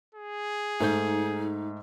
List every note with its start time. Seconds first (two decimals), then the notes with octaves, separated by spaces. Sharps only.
0.15 G#4
0.80 G#2 A3 D#4 G6